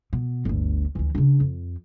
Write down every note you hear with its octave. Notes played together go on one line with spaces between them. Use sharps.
B2
G1 D2
D2 E3
C#3 D4
F2